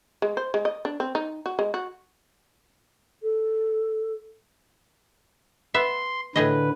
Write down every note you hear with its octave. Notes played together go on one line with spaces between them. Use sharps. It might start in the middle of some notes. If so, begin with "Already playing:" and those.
G#3
C5
G#3
D#5
D4
C4
D#4
F#4
G#3
F#4
A4
B3 E5 C6
A2 D3 G#4 B4 D#5